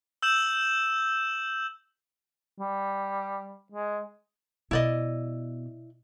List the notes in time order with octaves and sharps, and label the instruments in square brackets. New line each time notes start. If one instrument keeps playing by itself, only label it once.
[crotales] E6 G6 E7 F#7
[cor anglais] G3
G#3
[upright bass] B2 [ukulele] E4 D5 D#5